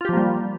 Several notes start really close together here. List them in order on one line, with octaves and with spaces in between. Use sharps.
F4 G4 F3 A#3 G3